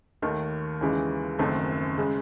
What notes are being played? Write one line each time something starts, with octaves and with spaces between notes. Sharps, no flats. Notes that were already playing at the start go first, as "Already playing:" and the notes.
D#2 D#3 A3
D#2 C#3 E3 G#3
F#1 F#2 D#3 A3 C4
C#3 G#3